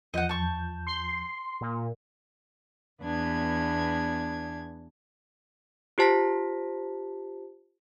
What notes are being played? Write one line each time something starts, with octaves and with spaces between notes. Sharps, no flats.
E2 F3 D#5 F#5 G6
A5 C#6
C6
A#2
E2 B3 D4 G#6
F4 G4 C5 A5 A#6 B6